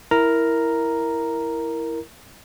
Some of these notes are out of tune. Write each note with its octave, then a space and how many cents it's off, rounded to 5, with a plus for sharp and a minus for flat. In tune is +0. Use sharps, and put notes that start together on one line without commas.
E4 +0 A#4 +0 A#5 +0